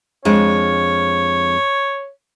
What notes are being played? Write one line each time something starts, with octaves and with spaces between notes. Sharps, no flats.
F2 G#3 D4 C#5